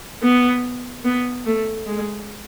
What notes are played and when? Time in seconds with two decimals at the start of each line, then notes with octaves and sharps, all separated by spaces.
0.23 B3
1.05 B3
1.46 A3
1.87 G#3